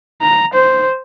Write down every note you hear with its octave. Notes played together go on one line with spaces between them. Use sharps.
A#5
C5